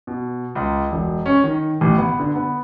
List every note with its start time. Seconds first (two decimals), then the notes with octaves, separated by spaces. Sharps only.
0.07 B2
0.55 C#2
0.92 E1
1.26 C#4
1.44 D#3
1.81 A1
1.98 B3
2.20 D3
2.35 B3